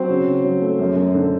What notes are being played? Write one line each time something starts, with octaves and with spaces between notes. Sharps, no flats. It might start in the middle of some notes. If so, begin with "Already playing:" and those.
Already playing: F#3 C4 C5
C#3
C#3
F#3
A3
F#2
F#2
D3